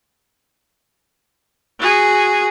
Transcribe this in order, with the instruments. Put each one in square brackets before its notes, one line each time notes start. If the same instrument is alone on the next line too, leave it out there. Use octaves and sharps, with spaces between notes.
[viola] F#4 G#4